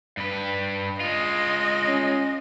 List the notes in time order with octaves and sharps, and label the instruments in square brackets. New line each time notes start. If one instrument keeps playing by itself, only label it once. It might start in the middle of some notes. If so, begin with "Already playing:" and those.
[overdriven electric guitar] G2 B4
[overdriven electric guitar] G#3 F4 [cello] D#5
[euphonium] C#4